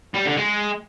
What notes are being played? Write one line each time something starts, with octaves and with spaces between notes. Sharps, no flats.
G3
D3
G#3